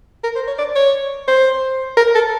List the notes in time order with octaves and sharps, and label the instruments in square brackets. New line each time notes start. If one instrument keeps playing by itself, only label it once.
[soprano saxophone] A#4
C5
C#5
D5
C#5
C5
A#4
A4